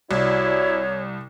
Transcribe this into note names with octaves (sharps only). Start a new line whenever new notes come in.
C2 E4 F#4 C#5 D5